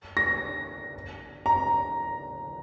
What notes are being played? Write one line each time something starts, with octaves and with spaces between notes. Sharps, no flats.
A#6
A#5